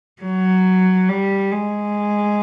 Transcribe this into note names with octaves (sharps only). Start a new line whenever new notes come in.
F#3
G3
G#3